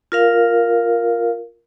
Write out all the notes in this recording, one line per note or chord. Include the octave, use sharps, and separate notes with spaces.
F4 A#4 F5